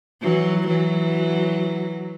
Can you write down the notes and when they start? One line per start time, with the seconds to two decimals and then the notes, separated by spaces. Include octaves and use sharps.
0.22 E3 F#3
0.67 E3 F#3